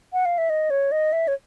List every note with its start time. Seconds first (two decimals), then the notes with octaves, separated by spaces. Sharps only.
0.13 F#5
0.25 F5
0.38 E5
0.50 D#5
0.70 C#5
0.92 D#5
1.13 E5
1.28 C#5